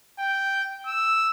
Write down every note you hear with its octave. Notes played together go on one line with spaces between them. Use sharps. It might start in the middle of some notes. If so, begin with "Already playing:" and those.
G5
E6